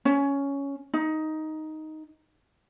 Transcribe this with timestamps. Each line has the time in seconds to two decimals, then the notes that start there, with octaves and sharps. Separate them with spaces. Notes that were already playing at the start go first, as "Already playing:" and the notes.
0.05 C#4
0.94 D#4